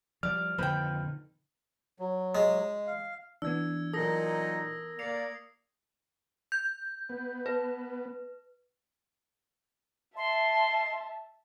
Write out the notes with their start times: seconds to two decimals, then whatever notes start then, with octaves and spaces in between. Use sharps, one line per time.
0.23 F3 G3 D5 F6
0.58 F2 A#2 D3 D#3 B4 C5 G5
1.99 F#3
2.35 G#3
2.87 F5
3.42 E3 B3 D4 E6 G#6
3.93 A#2 F#3 D#4 A4 A#4 D#6 A#6
4.99 A#3 D5 C7 C#7 F7
6.52 G6
7.09 B3
7.46 B4
10.17 E5 A5 C6